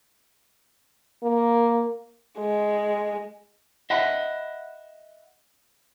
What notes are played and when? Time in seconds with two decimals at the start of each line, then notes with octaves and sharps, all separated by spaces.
1.24 A#3
2.39 G#3
3.90 D#5 E5 F#5 B5